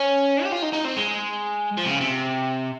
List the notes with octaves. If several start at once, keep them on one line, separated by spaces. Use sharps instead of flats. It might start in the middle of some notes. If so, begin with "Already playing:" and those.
Already playing: C#4
G4
F4
D#4
D#4
C4
G#3
F3
C3
C#3
C3